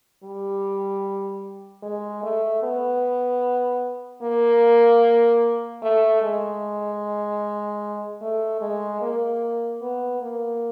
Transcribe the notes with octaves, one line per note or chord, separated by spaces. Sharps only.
G3
G#3
A3
B3
A#3
A3
G#3
A3
G#3
A#3
B3
A#3